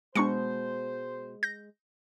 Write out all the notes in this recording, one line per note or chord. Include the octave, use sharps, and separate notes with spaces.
B2 G#3 D4 C5 C#6 C#7
G6 A#6